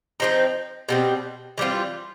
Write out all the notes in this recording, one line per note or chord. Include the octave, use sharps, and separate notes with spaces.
F3 G#3 C4 D#4
B2 G3 C4
E3 G3 C4 F4